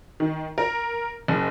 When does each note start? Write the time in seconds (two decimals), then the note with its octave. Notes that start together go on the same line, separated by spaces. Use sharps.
0.20 D#3
0.58 A#4
1.28 F#1